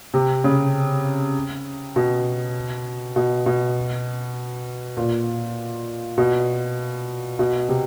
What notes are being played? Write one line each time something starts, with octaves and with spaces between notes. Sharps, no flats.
C3
C#3
B2
B2
B2
A#2
B2
B2
C3